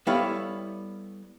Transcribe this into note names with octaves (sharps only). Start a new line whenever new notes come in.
G3 B3 E4 A4 C#5 F5